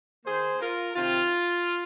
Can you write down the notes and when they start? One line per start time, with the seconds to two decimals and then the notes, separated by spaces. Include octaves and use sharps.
0.25 D#3 A#3 G#4 C5
0.60 F4 A#4
0.96 C3 D#3 C4 F4